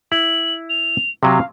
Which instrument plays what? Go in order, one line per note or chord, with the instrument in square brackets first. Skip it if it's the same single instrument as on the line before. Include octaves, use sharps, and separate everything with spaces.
[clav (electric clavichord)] E4 [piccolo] F#7
[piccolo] F7
[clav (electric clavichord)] C3 F#3 [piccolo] F5